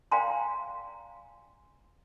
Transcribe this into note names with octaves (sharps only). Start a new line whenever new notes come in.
D5 F5 G5 G#5 A#5 C6